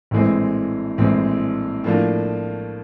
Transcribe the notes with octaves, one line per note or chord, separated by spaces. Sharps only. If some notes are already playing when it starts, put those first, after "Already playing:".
A#1 A2 E3 G#3 C4
A#1 A2 E3 G#3 C4
A2 F3 A#3 D4 F4